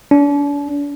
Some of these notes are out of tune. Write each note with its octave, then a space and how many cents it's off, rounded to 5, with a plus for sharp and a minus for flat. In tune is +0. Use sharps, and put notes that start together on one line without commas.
D4 -40